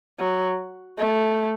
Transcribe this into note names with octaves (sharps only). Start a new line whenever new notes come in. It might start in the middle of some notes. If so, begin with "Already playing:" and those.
F#3
A3